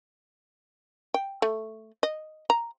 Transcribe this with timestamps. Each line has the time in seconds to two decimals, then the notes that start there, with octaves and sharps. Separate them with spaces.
1.14 G5
1.42 A3
2.03 D#5
2.50 A#5